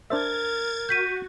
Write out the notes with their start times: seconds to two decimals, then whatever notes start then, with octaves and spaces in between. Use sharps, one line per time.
0.10 D4 A#4 C5 E5 G#6 A6
0.89 F#4 G6 B6 D#7